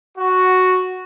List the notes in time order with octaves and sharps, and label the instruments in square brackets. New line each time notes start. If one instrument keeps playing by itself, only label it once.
[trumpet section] F#4